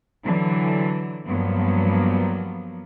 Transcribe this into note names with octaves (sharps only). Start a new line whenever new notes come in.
D3 E3 F#3
G2 F3 F#3 A#3 B3